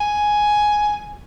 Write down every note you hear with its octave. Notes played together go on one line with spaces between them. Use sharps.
G#5